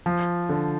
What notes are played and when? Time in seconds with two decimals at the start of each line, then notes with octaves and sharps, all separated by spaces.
0.06 F3
0.49 D3